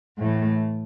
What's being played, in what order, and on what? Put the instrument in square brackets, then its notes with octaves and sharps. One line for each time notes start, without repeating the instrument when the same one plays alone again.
[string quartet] A2 E3 A3